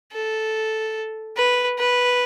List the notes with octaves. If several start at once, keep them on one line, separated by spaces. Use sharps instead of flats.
A4
B4
B4